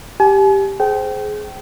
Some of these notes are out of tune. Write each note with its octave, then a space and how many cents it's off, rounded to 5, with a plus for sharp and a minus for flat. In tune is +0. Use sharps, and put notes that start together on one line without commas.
G4 +0 G#5 +40
G#4 +20 C5 +0 G5 -25